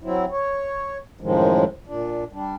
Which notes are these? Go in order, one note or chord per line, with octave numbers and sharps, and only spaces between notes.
F#3 C4 E4
C#5
F#2 A2 D#3 F3 G#3
A#2 D4
G3 D4